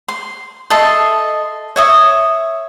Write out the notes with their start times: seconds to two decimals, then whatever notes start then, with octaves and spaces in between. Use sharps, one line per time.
0.08 C6
0.70 A4 D#5 E5 C6
1.76 C#5 E5 D#6